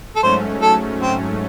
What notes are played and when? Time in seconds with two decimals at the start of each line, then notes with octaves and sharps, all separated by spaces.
0.16 A4
0.22 G#2 F#3 A3 C#4 C5
0.62 A4
1.02 C4